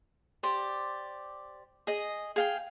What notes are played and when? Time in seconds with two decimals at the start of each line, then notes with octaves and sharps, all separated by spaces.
0.43 G4 C5 D5
1.87 G#4 D#5
2.36 G#4 F5 G5